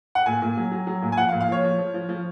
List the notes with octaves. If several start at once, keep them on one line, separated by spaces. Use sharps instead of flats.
F#5
A#2 G#5
A#2
F#3
F#3
F#3
A#2
G#5
F3 F#5
F5
A#2
F5
F3 C#5
F3
F3
F3
F3